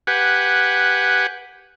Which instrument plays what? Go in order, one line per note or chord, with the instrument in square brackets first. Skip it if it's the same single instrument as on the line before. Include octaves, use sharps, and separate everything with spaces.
[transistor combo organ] G4 B4 F#5 G#5